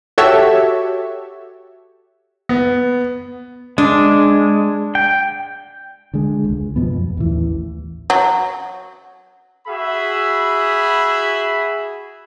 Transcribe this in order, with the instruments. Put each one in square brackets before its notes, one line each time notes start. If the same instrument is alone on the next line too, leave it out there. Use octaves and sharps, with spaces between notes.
[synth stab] F#4 G4 A4 C#5 E5
[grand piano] B3
[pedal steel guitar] G#3 [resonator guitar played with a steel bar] D4
[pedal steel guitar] G5
[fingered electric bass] D3 G#3
E1 C#2
F#2 B2 F3 B3
F2
A1 D#2 E3
[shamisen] F#3
[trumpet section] F#4 G#4 E5 B5